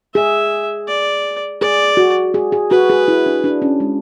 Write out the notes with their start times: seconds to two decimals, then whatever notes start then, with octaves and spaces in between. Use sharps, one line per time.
0.14 G#4 E5
0.88 D5
1.61 G#4 D5
1.97 F#4
2.34 G#4
2.52 G#4
2.70 F#4 B4
2.90 G#4
3.08 E4
3.26 D4
3.44 D4
3.62 C#4
3.80 G#3